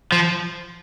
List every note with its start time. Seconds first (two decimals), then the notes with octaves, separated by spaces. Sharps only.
0.12 F3